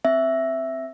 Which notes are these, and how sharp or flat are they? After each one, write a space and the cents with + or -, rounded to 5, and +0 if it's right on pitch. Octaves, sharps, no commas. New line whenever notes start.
C4 +0 E5 +0